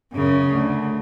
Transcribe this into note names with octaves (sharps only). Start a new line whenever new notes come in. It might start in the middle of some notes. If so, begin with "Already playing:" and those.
F#2 C#3
D2